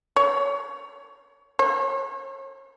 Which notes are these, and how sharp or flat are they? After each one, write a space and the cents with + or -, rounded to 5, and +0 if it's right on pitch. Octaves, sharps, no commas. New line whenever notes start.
C#5 +20
C#5 -40